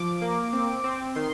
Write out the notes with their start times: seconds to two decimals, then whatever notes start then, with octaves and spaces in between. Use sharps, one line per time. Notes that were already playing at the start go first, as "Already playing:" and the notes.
Already playing: F3 D6
0.21 A#3
0.53 C4
0.84 C4
1.15 D#3 C6